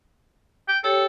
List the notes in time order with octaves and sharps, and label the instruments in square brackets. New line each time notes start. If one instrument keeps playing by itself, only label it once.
[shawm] G5
[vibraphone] G4 C#5 G5 [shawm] A4